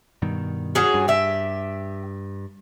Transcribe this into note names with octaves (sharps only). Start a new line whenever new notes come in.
G2 B2 D#3
F#3 C#4 G#4
G2
G4 E5